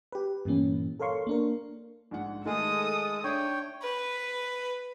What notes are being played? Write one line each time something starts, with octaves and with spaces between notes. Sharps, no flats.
G4 B4
G2 A#2 E3 A#3 C#4
A4 A#4 C#5 F5 C6 C#6
A#3 D4 A#4
A#1 G#2 F#5
D#3 G#3 A3 G#4 A4 D#6
D4 C#5 E5 G5
B4